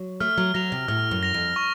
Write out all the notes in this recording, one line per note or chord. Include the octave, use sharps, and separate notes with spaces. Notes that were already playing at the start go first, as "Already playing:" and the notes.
Already playing: F#3
A3 F6
F#3
F#3 A#6 F7
C3
A2 F6
F#2
A#6 F7
F2
C#6